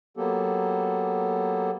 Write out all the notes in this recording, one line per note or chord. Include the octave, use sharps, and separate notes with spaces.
F#3 A#3 B3 G4 A4